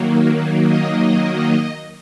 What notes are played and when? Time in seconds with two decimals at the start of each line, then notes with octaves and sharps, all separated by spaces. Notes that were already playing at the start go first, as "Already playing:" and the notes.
Already playing: D#3 F#3 A#3
0.66 D#5